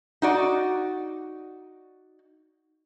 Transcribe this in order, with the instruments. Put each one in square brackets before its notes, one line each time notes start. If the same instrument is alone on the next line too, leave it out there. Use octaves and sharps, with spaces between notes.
[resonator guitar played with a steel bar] D#4 F#4 D5